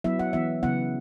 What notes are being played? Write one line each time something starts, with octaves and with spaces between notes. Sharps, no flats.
F#3 B3 E4 E5
F#5
E3 B3 E4 E5
C#3 F#3 B3 E4 F#5